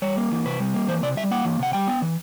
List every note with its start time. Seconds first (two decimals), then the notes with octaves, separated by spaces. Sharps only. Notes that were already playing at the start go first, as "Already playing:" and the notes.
0.02 G3 C#5
0.17 A#3
0.31 E3
0.46 C3 B4
0.60 G3
0.74 A#3
0.88 E3 C5
1.03 C3 D5
1.17 G3 E5
1.31 A#3 F#5
1.45 E3
1.59 C3 F#5
1.73 G3 G5
1.87 B3
2.02 E3